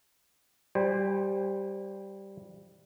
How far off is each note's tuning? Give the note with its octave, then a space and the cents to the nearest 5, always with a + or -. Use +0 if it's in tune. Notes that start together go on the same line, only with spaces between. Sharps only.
G3 +0 C5 +0 G#5 -35